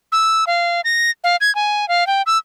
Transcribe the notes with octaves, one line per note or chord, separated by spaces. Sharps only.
E6
F5
A#6
F5
G#6
G#5
F5
G5
E6